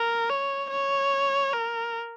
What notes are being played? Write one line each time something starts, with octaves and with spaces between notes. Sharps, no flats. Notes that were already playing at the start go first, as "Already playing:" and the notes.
Already playing: A#4
C#5
C#5
A#4